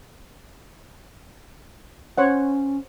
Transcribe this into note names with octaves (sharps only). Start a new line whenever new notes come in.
C#4 C5 C#5 F#5